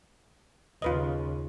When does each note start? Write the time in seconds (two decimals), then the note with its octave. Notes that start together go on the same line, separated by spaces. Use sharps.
0.82 D#2 C#3 F4 B4 D#5